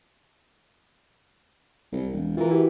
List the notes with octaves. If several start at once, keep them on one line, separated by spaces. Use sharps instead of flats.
C2
E1
E3 F4 A#4
E4 F#4 G4